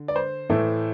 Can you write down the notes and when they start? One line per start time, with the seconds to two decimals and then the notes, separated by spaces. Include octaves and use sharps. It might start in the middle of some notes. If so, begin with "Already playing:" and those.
Already playing: D3
0.08 D5
0.16 C5
0.49 A2 E3 A3